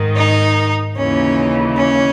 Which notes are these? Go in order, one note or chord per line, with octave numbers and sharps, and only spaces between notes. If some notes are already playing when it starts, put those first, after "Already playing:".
Already playing: G#2 D#3
D#4
D#2 C#3 E3 C#4
C#4